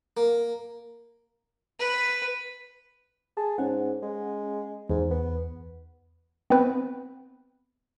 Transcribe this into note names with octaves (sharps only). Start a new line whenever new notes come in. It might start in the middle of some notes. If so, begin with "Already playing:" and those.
A#3
B4
G#4 A5
G#2 C#4 F#5
G#3
E2 G#2
B3
B3 C4 B4